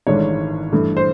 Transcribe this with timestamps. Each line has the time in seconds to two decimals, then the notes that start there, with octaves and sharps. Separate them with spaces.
0.07 G#1 G#2 E3 A3 D4 C#5
0.72 G2 E3 A3
0.97 C5